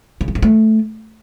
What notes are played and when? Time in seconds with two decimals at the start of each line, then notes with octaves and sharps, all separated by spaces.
0.21 C#3
0.28 F#3
0.35 G2
0.43 A3